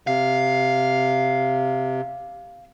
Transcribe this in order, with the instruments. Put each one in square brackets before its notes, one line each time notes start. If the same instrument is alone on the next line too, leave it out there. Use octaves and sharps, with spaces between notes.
[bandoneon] C3 [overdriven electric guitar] F5